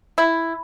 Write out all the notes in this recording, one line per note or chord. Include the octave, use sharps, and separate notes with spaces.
E4